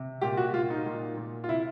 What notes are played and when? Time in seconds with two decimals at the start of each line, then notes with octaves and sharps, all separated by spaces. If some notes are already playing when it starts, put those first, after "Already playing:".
Already playing: C3
0.21 A#2 G4
0.37 F#4
0.53 A#2 F4
0.70 D#4
0.86 A#2
1.17 A#2
1.44 F4
1.49 C3 E4